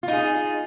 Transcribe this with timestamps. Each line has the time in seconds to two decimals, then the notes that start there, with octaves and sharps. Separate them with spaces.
0.03 F4
0.08 D#4
0.13 G#4